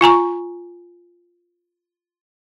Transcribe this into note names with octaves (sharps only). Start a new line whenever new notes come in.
F4 G#5 A#5 C#6